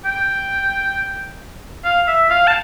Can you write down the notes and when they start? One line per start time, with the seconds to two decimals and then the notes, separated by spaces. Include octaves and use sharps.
0.06 G5
1.85 F5
2.08 E5
2.30 F5
2.47 A5